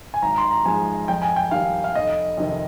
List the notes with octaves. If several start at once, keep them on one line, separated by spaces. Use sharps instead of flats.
G#5
G#1 A#5
C6
A#5
G#2 F3 G#3 G#5
F2 G5
G#5
G5
D#3 G3 F5
F5
F1 D#5
F2 C3 D#3